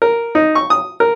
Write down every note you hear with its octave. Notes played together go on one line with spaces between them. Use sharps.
A#4
D#4
C#6
D#6
A#4